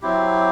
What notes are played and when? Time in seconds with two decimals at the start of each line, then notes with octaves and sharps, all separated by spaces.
0.02 F#3 C4 E4 G4